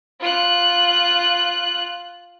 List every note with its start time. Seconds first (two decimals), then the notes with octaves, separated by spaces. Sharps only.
0.20 F4 F#6